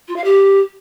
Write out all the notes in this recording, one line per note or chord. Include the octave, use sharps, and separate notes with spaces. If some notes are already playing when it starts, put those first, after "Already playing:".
F4
F5
G4